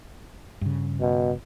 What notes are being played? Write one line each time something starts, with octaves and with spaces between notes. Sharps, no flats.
G2 C#3
B2